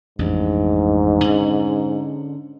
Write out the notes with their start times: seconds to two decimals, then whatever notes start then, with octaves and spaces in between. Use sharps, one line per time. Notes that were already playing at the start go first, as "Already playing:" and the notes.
0.19 A1 F2 G#2 D4
1.24 D3 C#4